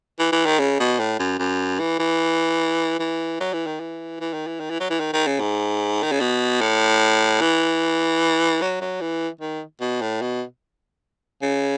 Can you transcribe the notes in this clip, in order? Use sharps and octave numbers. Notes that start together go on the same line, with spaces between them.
E3
E3
D#3
C#3
B2
A2
F#2
F#2
E3
E3
E3
F#3
E3
D#3
E3
E3
D#3
E3
D#3
E3
F#3
E3
D#3
D#3
C#3
G#2
D#3
C#3
B2
A2
E3
F#3
F#3
E3
D#3
B2
A2
B2
C#3